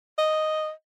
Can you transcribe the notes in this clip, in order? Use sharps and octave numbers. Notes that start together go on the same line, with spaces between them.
D#5